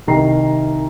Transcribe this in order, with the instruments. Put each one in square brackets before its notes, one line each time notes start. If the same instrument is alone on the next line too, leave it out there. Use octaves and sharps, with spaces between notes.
[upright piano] C2 D#3 G4 A#5 C7